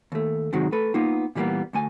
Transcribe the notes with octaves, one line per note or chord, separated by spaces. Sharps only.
D#2 A3
G#2 C3 D#3 F#3 G#3 F#4
A3 A4 B4
A#3 B3 D#4 F4
A#2 E3 G3 G#3 A#3 B3
D2 A3 G#5